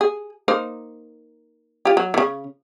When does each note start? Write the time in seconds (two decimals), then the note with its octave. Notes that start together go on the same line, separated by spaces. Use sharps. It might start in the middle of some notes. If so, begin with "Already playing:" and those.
0.01 G#4
0.48 A#3 D#4 C5
1.85 F4 G4
1.97 F#3
2.14 C#3 E3